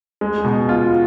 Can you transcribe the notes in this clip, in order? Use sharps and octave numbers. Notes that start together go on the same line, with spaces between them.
G#3
B2
F4